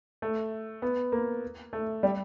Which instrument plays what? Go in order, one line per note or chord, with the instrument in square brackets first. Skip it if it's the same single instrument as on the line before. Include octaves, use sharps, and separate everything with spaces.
[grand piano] A3
B3
A#3
A3
G3